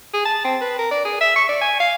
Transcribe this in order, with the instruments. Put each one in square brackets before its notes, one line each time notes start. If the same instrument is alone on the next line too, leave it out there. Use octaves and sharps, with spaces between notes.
[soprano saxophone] G#4
A5
C4
B4
A#4
D5
G#4
E5
C#6
D5
G#5
F5